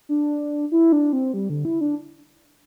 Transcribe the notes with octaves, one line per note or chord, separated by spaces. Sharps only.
D4
E4
D4
C4
G3
D3
E4
D4